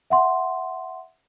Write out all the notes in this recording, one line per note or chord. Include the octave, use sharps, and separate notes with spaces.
E5 F#5 C6